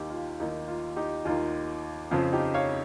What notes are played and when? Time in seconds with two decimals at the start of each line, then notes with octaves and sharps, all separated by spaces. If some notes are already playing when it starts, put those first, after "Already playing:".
Already playing: D#2 D#3 D#4 G4
0.10 F4
0.40 D#2 D#3 D#4
0.68 F4
0.96 D#4 G4
1.25 D#2 D#3 F4
2.11 F2 C#3 F3 F4
2.32 D#4 G4
2.54 C#5 F5